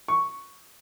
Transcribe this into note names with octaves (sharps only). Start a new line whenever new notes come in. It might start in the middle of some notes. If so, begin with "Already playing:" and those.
C#6